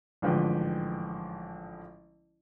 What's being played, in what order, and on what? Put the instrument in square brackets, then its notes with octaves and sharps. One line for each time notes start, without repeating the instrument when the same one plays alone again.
[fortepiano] A1 G#2 D3 F3 B4 G5